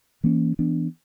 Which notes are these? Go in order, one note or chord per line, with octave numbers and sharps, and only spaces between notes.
E3 A#3 C#4
E3 B3 D4